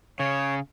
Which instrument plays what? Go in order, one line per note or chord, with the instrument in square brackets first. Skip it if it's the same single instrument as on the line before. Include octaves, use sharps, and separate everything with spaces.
[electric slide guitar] C#3 [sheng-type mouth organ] C#5